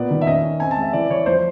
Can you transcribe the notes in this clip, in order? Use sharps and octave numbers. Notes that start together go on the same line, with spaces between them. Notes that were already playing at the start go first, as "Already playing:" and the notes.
Already playing: A#2 B3 D5
D#3
E5
C#4 D#5
C#4
C4 G#5
A5
G#3
E5
E3 D5
E3 C#5
F3 C5